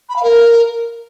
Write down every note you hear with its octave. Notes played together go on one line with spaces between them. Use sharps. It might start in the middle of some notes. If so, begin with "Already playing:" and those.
B5
F5
A#4